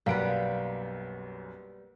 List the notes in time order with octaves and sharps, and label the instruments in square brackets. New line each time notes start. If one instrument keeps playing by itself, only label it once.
[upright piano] B1 F#2 D7 [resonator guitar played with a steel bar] G3 B3 [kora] A#3 B4